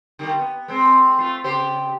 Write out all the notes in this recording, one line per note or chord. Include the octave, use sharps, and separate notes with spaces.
D3 D#3 G3
B3
G#3 C4
A3 F4
C#3 G4 C5